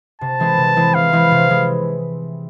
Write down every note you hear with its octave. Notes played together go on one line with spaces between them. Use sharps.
C3 A5
E3 G#3 C4 E4
C3
E3 G#3 C4 E4
C3 F5
E3 G#3 C4 E4
C3
E3 G#3